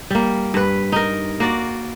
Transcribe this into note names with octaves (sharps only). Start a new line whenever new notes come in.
G3 A#3
G2 B4
D#4 A#4
A#3 F#4 D5